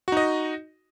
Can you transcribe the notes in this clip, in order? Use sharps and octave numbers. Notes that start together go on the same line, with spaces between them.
D#4 F#4 D#5